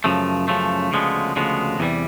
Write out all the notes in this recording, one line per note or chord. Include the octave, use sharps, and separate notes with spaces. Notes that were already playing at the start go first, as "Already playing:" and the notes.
F#2 C#3 F3 A3
F#2 C#3 F3 A3
D2 C#3 F3 G#3 B3
D2 C#3 F3 G#3 B3
E2 C3 E3 G3